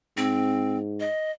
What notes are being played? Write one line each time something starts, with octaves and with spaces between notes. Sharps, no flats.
G#2 C4
D#5